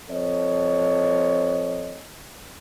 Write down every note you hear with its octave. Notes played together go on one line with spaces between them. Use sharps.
F3 C4 A4 C#5 D#5